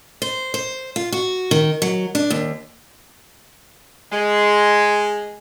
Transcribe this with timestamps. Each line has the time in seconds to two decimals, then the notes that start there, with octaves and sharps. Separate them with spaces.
0.22 C5
0.54 C5
0.96 F4
1.12 F#4
1.51 D#3
1.82 F#3
2.15 D4
2.30 D#2
4.12 G#3